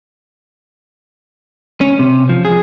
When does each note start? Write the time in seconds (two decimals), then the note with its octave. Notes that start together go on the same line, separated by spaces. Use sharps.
1.81 C#4
1.99 C3
2.29 F3
2.45 G#4